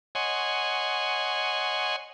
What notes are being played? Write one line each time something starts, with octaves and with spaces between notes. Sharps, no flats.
C#5 D#5 F#5 G#5 C6